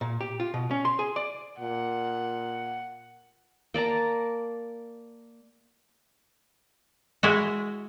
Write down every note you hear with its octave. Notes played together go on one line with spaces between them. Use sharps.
A#2
G4
F4
B2
C#4
C6
G#4
D5
A#2 F#5
A#3 D5 A5 A#5
G#3 E4 F#4